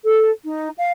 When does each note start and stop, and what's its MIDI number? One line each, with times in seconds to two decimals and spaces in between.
0.05 0.31 69
0.44 0.69 63
0.77 0.92 77